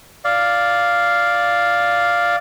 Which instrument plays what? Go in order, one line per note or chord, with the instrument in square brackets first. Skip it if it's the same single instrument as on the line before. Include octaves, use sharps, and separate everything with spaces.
[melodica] D5 F5